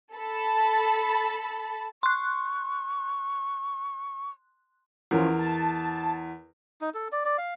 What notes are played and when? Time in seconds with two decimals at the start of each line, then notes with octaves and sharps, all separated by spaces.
0.14 A4 A5 B5
2.03 C6 C#6 F#6
5.11 E2 F3 C#4 A#4
5.39 A5
6.81 D#4
6.94 A4
7.12 D5
7.25 D5
7.38 F5